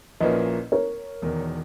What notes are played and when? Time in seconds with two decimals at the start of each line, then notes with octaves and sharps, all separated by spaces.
0.20 A#1 A#2 A#3 C#4 E4 B4 D#5
0.72 A#4 C#5
1.22 E1 E2 D#3